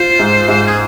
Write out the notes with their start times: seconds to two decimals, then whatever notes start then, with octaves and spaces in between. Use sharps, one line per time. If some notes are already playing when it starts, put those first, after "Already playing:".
Already playing: F4 C5
0.19 G#2
0.48 G#2
0.67 G#4